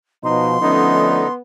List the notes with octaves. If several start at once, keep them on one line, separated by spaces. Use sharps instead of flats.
B2 F3 D#4 C6
D3 F3 A3 B3 C#4 D#4